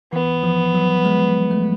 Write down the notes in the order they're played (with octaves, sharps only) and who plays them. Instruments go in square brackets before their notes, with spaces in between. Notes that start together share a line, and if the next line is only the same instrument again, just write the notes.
[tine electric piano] E3 [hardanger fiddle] B3
[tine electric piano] F3
F#3
G#3
A3